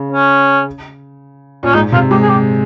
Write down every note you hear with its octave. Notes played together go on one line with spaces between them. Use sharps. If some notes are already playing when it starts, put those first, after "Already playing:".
Already playing: C#3
C#4
A#2 C#4
G#2 D#4
C3 F4
G#3 G4
G#4
G4